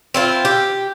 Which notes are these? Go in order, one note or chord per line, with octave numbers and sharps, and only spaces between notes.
C4 E4 F4
G4